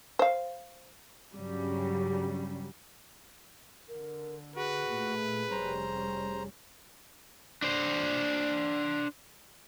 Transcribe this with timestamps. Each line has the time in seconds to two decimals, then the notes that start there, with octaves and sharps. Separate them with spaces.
0.19 C5 F5
1.35 G2 C#3 F#3 G3
3.88 D3 A#4
4.56 F#4 G#4 B4
4.87 A#2 A3
5.51 F1 G3 C#4 C5 A#5
7.62 D4 C5